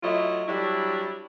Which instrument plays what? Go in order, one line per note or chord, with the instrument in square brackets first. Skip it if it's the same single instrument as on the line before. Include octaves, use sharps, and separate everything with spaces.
[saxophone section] F#3 A3 E4 F4 D#5
F#3 G3 D4 E4